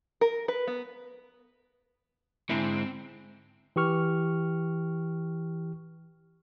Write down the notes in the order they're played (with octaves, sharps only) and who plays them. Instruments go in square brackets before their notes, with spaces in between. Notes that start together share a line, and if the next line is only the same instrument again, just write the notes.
[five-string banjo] A#4
B4
B3
[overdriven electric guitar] G#2 [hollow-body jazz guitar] D3 E4 [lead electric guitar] C4
[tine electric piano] E3 G4 C#6 F6